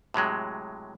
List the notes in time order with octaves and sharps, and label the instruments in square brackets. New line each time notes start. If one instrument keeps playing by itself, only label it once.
[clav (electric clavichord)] A2 C3 F#3 G#3